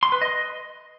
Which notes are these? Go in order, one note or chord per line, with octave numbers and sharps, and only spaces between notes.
C6
B4
D#5